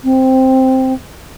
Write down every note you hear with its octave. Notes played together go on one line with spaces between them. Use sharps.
C4